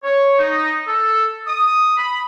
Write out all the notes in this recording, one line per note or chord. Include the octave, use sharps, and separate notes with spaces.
C#5
D#4
A4
D#6
B5